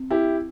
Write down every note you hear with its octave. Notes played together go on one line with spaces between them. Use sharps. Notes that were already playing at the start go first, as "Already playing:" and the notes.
Already playing: C4
E4 G4